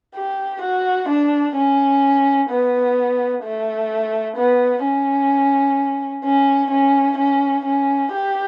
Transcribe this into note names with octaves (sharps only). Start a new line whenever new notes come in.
G4
F#4
D4
C#4
B3
A3
B3
C#4
C#4
C#4
C#4
C#4
G4